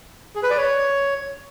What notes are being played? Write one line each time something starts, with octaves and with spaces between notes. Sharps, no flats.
G#4
B4
D5
C#5